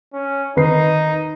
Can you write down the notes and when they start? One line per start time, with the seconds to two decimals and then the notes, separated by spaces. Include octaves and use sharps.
0.14 C#4
0.57 D#3 D#4 B4 C7